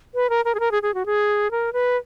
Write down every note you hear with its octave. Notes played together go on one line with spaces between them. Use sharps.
B4
A#4
A#4
G#4
A#4
G#4
G#4
F#4
G#4
A#4
B4